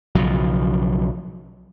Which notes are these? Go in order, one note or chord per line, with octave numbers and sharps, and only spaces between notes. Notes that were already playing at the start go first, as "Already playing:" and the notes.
B1 C#3 F3 F#3